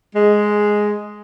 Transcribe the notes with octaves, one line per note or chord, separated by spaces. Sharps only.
G#3